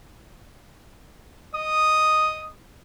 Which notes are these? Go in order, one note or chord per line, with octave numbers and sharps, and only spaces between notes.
D#5 D#6